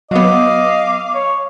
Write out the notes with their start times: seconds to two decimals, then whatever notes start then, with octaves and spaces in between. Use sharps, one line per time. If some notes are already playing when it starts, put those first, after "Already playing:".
0.11 F#3 B3 D#5 F5 D6
1.14 C#5